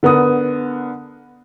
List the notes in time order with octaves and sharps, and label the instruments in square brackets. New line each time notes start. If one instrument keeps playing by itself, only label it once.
[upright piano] D3 B3 A#4 D#6